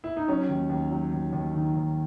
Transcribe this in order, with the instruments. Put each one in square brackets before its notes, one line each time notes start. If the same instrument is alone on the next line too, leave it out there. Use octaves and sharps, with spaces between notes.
[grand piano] E4
D#4
F#3 C#4
D#2
D#2
F#3
D#2
D#2
D#3
D#2